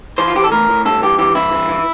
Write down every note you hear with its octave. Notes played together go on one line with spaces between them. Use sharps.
E3 C5
F4
E3 G4
A4
A2 A#4
A2
G2 A4
E3 G4
E3 G4
G2 E4
E3
E3